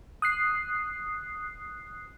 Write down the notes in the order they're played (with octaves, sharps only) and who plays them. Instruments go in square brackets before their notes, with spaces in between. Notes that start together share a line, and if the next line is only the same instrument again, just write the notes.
[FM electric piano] D#6 F#6 C7